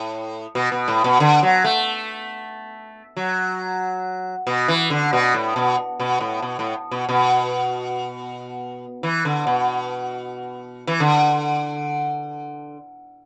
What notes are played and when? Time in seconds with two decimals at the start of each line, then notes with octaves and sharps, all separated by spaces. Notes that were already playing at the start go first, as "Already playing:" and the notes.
Already playing: A2
0.55 B2
0.72 B2
0.88 A2
1.04 B2
1.20 D3
1.43 F#3
1.64 A3
3.17 F#3
4.47 B2
4.68 E3
4.90 D3
5.13 B2
5.34 A2
5.56 B2
6.00 B2
6.20 A2
6.42 B2
6.59 A2
6.91 B2
7.09 B2
9.03 E3
9.25 D3
9.47 B2
10.87 E3
11.00 D3